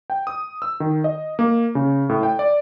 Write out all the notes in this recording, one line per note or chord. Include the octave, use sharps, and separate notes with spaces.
G5
D#6
E6
D#3
D#5
A#3
C#3
A2
G5
D5